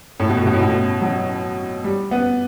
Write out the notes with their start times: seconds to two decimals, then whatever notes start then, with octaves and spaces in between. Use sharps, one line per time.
0.20 A2
0.29 B2
0.37 A2
0.45 B2
0.54 A2
0.61 B2
0.70 A2
1.02 F#3
1.84 G3
2.11 B3